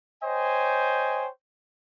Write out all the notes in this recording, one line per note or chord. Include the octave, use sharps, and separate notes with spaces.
C5 C#5 D#5 G5 G#5